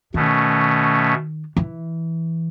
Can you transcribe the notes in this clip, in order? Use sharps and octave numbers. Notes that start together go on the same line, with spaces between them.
B2 D#3 A3 C#4
E3